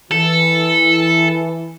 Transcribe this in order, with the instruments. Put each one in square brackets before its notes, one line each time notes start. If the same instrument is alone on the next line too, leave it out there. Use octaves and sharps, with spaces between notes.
[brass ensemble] E3 [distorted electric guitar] A4